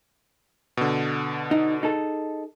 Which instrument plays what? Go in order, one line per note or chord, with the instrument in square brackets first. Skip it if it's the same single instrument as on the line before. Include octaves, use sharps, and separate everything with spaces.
[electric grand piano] B2 D3
[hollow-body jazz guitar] D#4
D#4 G#4 A4